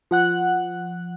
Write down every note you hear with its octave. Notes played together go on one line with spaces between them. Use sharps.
F3 F#5 F#6